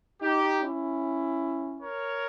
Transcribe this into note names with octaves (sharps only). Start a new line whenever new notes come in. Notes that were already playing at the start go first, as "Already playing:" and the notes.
D#4 G4
C#4 E4
A#4 C#5